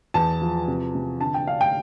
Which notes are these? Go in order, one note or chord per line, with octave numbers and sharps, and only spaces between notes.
E2 A5
F3
C3
C3
D3 A5
G5
D4 F5
G5